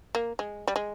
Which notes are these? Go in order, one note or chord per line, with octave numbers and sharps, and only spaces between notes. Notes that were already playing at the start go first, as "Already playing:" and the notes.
A#3
G#3
G3
G#3